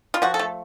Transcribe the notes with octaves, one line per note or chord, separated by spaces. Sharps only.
F4
F3 F#4
A4
A3